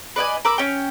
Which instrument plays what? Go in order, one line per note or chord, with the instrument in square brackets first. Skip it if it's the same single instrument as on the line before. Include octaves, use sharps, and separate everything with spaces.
[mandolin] B4 D5 D#5 G#5
A#4 B5 D6 E6
C#4 G5